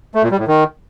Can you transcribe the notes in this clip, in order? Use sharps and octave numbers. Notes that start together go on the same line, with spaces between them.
A3
A#2
G3
A2
D#3